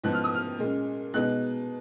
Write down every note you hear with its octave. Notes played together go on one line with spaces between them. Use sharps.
G#2 F3 B3 F#6
F6
D#6
F6
A#2 G#3 C#4
B2 G#3 D#4 F#6